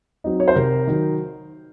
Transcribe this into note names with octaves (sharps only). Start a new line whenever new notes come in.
F#3 C4 D#4
C#5
C5
C3 A#4
D#3 F#3